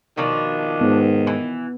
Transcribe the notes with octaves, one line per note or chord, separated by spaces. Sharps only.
B2 D#3 F3 D4
G#2 B3
E3